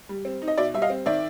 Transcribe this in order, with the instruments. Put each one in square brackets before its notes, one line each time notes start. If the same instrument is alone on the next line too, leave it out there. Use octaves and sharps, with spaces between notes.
[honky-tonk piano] G3
C4
D#4
D#5
B2 D5 E5
G3 E5
D#5 F5
C4
D#3 D5 E5